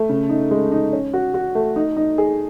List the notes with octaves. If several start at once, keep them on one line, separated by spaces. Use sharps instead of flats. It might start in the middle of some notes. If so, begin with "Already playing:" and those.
Already playing: A3
C#3
D#4
G#3
D#4
C#4
F#4
F#4
A3
D#4
D#4
G#4